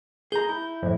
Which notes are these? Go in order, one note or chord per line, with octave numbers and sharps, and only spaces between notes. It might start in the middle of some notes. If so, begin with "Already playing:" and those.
G#4 A#5 G6
E4
F2 A2